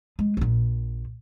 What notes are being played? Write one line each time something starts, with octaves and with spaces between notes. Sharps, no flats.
G#3
A#1 A#2